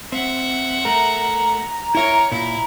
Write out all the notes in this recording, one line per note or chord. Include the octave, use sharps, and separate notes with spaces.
C4 E5 F#5
A3 A#4 A#5
E4 A#4 C#5 E5
A#2 E4